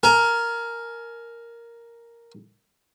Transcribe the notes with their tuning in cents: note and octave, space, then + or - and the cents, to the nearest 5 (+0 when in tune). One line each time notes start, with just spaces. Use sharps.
A#4 +0 G#5 +35